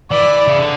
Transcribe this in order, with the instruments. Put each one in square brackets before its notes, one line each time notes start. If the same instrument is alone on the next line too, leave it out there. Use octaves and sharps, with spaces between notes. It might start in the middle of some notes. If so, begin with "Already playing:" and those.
[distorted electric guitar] E3 [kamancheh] D5
[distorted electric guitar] C#3
D3